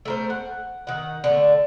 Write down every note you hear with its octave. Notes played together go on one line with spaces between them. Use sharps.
A3 A#4 C5
F#5
D#3 F#5
D3 A3